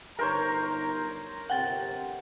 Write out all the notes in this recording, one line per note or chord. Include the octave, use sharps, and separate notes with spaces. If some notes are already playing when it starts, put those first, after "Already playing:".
G1 D#4 A#4 C5 C#5 A#5
G1 C3 F#5 G5 A6